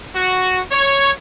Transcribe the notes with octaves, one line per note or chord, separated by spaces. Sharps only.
F#4
C#5